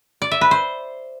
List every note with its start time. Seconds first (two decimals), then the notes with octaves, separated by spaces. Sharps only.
0.22 D5
0.31 E5
0.41 B4
0.51 C5